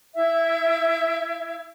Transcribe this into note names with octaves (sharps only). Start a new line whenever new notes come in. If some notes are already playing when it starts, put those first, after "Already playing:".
E4 E5